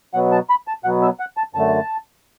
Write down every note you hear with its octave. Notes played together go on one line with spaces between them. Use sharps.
B2 F#3 B3 F#5
A5
B5
A5
B2 F#3 B3 F#5
E5
F#5
A5
F#2 D3 A3 A5